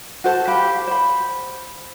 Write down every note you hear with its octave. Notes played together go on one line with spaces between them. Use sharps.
F#4 A4 C5 A5
G4 F5 B5
C5 B5